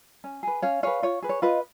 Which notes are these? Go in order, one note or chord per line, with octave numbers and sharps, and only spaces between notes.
C#4
G#4 B4
C#4 C#5 F5
G#4 B4 C#5 F5
F4 C#5
G#4 B4
C#5
F4 B4 D#5